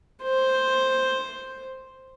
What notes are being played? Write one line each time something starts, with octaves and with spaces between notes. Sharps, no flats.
C5